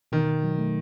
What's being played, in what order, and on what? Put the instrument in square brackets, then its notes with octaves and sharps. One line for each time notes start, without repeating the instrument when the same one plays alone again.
[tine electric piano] B2 [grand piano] D#3
[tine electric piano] B2
F#3
A3